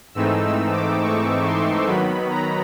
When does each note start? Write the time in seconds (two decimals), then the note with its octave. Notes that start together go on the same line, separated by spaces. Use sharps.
0.14 G#2 E3 A3 C4 D#4 E6
0.44 E6
0.72 D6
1.01 C#6
1.44 C6
1.87 D#3 F#3 B3 B5
2.30 A#5